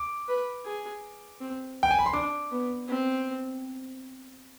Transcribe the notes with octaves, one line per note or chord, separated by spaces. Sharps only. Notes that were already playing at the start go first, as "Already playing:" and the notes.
Already playing: D6
B4
G#4
C4
G5
G#5
B5
C6
D4 D6
B3
C4